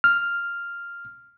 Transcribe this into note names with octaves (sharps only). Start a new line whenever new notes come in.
F6